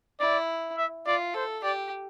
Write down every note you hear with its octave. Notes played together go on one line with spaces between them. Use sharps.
E4 D5
E5
F4 D5
A4 C5
G4 D5